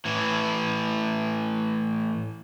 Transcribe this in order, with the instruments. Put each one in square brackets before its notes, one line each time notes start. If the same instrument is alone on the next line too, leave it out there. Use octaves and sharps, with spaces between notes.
[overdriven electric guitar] A2 E3